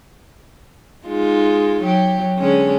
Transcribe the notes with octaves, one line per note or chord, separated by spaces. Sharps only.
G#3 D#4 F4
F#3 G4
D3 G#3 C#4